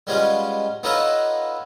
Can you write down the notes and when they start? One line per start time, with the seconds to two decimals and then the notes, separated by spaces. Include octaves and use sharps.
0.07 G3 G#3 B3 C#4 F4
0.83 B3 D#4 F4 A4 B4 C#5